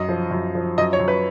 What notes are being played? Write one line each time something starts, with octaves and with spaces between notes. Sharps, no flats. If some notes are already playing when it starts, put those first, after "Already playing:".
Already playing: F#2 D#5
F3
F#2
F3
F#2 D#5
C#5
F#2
B4